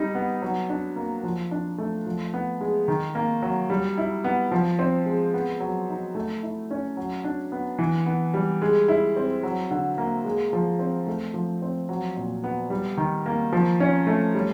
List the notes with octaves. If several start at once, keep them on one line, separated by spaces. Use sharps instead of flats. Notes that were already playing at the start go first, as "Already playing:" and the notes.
Already playing: G3 D#4
B3
F#3
D4
A#3
F3
D4
A3
F3
B3
G#3
D#3
A#3
F#3
G3
E4
B3
F3
C4
G#3
B3
F#3
D#4
A3
E4
C#4
F#3
D4
B3
E3
B3
G3
G#3
E4
C4
F#3
D3
A#3
G#3
F3
C4
A3
F3
C4
F#3
A#2
B3
G3
D#3
A#3
F3
C#4
A3
G3